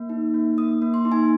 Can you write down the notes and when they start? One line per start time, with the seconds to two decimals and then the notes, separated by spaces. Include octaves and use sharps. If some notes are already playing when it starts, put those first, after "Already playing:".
Already playing: A#3
0.09 D#4
0.34 A#3
0.57 A#3 D#6
0.82 A#3
0.94 C6
1.05 D#4
1.12 G#5